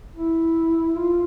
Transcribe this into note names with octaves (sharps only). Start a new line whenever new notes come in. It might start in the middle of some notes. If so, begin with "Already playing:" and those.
E4
F4